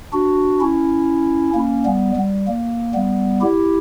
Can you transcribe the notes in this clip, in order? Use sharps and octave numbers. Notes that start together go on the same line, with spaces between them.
D4 F#4
C#4 E4
A#3 C#4
G3 B3
G3
A#3
G3 B3
E4 G4